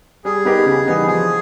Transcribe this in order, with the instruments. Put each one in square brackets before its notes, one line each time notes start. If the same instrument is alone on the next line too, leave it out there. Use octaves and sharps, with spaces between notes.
[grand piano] G3 [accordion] G#4
[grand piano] B3 D#4 G4 A#4
C#3
E3 G3 B3 D#4
[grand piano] F3 [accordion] G#4